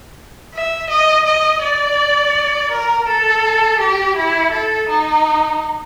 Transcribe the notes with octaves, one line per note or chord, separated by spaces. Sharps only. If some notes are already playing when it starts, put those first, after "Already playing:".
E5
D#5
D#5
D5
A#4
A4
G4
E4
A4
D#4